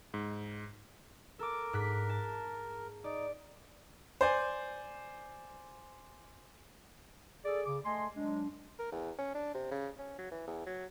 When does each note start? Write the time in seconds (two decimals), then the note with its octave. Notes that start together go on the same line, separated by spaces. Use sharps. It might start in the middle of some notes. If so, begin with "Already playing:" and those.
0.14 G#2
1.39 A4 A#4 D6
1.73 G#2 F#6 B6
2.09 A5
3.04 D#4 D5
4.21 C5 D5 G#5
7.44 G#4 A4 D5
7.66 C#3 D6
7.85 A3 D#5 G#5 C6
8.15 F#3 G#3 D4
8.79 A#4
8.92 E2
9.18 C#4
9.34 D4
9.54 C3
9.71 C#3
9.98 C#4
10.18 F#3
10.31 E3
10.47 E2
10.66 F#3